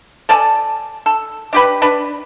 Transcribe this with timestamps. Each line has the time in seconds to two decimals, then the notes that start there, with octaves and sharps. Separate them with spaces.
0.29 A4 D5 G#5 A5
1.06 A4
1.53 D4 G4 B4
1.82 D4 B4